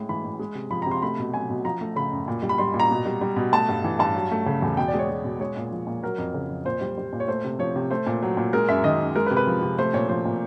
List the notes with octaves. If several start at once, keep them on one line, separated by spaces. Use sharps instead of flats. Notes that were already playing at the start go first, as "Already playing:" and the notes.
Already playing: A2 G#3
E3 B5
A2
G#3
C3
F3 B5
C3 A#5
C6
A3 B5
B2
F#3 G#5
B2
F3 A#5
A3
C#3 B5
F#2
A#2
G3
B5
G3 C6
A#2
A#5
B2
G3
G3
B2
A3 A5
G2
E3
G2 A5
F#3
A3
C#3
E2
B2 G5
D5
G#3 C#5
G#3
B2
G#3 C#5
A#2
F3
A#2
F#3 A#4
F2
C#3
F2
A#2 C5
G3
G3
A#2
C#5
A3 C5
C3
F3 C#5
C3
A3 C5
A#2
F#3
A#2
G#3 A#4
F#2 E5
D#3 D#5
F#2
G#3 A#4
B4
C3
B4
F3
C3
A3 C5
A#2 C#5
F3 C5
A#2